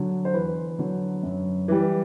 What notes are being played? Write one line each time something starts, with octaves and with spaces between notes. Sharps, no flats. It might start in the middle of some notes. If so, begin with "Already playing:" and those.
Already playing: D3 F#3
C5
E2 B4
D3 F#3
F#2
E3 G3